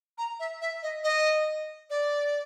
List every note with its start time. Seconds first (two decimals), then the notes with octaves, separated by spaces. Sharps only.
0.18 A#5
0.40 E5
0.61 E5
0.83 D#5
1.04 D#5
1.90 D5